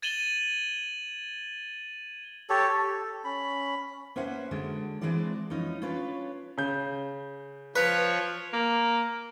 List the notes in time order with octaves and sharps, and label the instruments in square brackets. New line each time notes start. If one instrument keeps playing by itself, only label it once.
[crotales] G#6 A6 D#7 E7 F#7 G7
[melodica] G4 A4 C#5
A4
C#4 B5
[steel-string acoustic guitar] A#3 C#4 B4 C5 E5 F#5
D3 F#3 G#3
E3 G#3 C4 D4 F#4 D5
E3 F3 C#4 D#4
C#4 D4 F4 B4 C#5
[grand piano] C#3 G6
[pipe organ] F3 C#5 [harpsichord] B4
[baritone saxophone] A#3